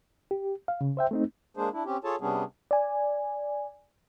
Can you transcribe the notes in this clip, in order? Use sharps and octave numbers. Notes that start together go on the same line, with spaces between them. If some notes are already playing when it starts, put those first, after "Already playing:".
G4
F5
C#3
C5 E5 G5
A3 C4 D#4
G#3 A#3 D4 G#4 C5
D4 E4
C4 C#4 G4
F4 G#4 A4 C#5 A5
C3 G3 B3 C#4 D4 G#4
D5 G#5